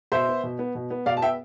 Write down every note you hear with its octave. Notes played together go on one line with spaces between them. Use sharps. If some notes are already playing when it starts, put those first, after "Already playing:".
B2 C5 E5
B3
B2
B3
B2
B3
B2 D5 F5
A5
B3 E5 G5